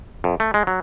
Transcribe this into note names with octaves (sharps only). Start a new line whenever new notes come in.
F2
A3
G#3
F#3